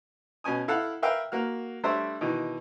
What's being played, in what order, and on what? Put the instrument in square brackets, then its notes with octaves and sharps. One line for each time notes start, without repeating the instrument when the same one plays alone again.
[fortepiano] B2 C#4 G#5 D#6
E4 A4 F5 F#5
A#4 B4 E5 F5 G5
A#3 F#4 F6
G3 A3 D4 C5 C#5 E5
B2 D#3 E3